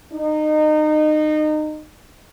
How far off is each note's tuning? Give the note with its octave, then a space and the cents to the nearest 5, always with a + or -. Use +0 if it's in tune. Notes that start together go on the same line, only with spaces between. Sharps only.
D#4 -25